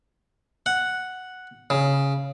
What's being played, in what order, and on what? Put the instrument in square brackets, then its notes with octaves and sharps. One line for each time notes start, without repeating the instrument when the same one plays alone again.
[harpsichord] F#5
C#3